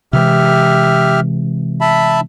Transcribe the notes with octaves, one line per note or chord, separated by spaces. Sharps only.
C3 E3 G#3 G4 E5 F6
E5 A5 B5